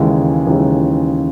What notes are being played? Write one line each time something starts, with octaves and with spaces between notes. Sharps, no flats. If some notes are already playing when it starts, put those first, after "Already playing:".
Already playing: D#2 C#3 E3 G#3
D#2 C#3 E3 G#3